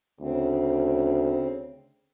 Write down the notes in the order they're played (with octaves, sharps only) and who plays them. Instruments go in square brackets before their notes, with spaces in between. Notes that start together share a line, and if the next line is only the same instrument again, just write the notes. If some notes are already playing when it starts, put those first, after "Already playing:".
[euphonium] D2 [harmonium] C#3 C4